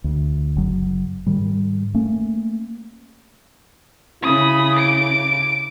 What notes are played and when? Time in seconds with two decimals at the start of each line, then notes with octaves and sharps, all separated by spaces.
0.04 D2
0.56 F#1 F#3
1.26 G#2 D#3 G3
1.94 A3 A#3 C#4
4.23 C#3 E4 B5 D#6
4.75 D6 D7